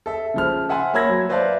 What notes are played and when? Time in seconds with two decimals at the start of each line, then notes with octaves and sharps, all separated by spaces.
0.06 A4 E5
0.34 C#3 F3 F6
0.69 E5 F#5 G#5 A5 C6
0.94 A#3 C#5 B5 E6 G#6 A#6
1.09 F#3
1.29 B4 C5 D5 E5 F5 A5